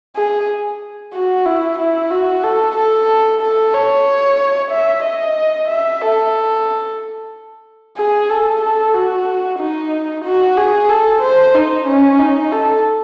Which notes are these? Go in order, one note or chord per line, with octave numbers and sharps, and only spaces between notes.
G#4
F#4
E4
E4
F#4
A4
A4
A4
C#5
E5
D#5
E5
A4
G#4
A4
A4
F#4
D#4
F#4
G#4
A4
C5
D#4
C#4
D#4
A4